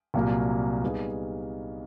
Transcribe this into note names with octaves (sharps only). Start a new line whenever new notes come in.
C2 A#2 F#3 A#3
G3 B3 D#4 G#4